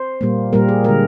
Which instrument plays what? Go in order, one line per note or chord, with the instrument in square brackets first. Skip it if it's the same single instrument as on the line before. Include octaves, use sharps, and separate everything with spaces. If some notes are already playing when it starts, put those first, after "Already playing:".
Already playing: [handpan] C5
A#2 G3 A#3
A#2 G3 A#3 A#4
G#4
D3 G#3 A#4